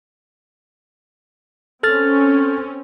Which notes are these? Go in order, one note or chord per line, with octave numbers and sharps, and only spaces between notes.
C4 C#4 A4 F6 A6